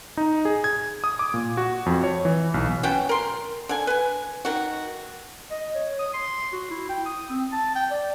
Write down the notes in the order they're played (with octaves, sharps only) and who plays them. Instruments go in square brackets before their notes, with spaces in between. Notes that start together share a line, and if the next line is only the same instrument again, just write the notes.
[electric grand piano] D#4
G#4
G#6
D#6
D6
A#2
F#4
F2
C#5
E3
B1
[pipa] B3 C#4 F#4 G5
A#4 C6
D3 G#5
B4 G#5
D#3 F#4
[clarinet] D#5
C#5
D#6
C6
F#4
E4
G5
D#6
C4
A5
G5
D5